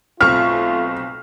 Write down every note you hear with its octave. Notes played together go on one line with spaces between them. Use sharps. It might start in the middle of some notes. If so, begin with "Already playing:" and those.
B1 A3 C4 F4 C#6 F6